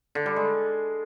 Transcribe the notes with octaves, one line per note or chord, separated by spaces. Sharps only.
D3
G3
G#3